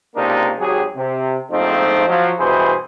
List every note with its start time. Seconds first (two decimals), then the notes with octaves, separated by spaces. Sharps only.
0.15 C#2 C3 A#3 D4 D#4 A#4
0.58 G#1 F#3 G4 G#4
0.96 C3
1.51 A#1 G#2 F3 A3 C4 D#4
2.07 F3 F#3
2.39 G2 B2 E3 E4 G#4 C5